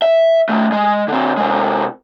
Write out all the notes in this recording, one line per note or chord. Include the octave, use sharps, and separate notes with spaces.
E5
D#3 A3
G#3
D3 C4
C3 G#3